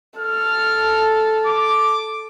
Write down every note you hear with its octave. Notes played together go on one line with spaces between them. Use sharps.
A4 F6
D6